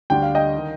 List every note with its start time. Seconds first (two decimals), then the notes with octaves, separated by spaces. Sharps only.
0.10 D2 D3 G3 D4 G5
0.22 F5
0.35 D#5 G5
0.57 D#3